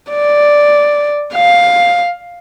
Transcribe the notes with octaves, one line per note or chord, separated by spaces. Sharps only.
D5
F5